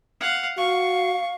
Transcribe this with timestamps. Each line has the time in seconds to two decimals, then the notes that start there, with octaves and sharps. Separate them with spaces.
0.20 F5 F#5
0.57 F#4 F5 C#6